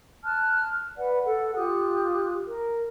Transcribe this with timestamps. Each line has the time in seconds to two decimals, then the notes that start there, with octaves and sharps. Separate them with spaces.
0.24 A5 F6 F#6
0.96 B4 D5 F#5
1.25 A4 F#5
1.56 F4 G4 D#6 F#6
2.47 A#4